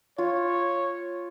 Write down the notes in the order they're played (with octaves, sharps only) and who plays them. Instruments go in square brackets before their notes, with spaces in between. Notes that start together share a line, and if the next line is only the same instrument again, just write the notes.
[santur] F4 [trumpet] C#5